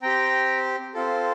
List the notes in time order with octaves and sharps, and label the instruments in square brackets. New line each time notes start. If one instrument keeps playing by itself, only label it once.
[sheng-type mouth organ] C4 G4 G5 A#5
C4 F4 A4